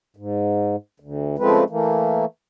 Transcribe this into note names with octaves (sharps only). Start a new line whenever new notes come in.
G#2
D2
C#3 F3 G#3 A3 C4 B4
E3 A3 A#3